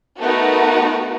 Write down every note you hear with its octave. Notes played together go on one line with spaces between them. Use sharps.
A3 B3 D#4 F#4 A#4